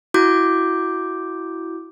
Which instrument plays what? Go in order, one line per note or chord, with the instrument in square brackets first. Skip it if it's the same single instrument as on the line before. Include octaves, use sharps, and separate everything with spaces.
[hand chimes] E4 F#4 D6 G6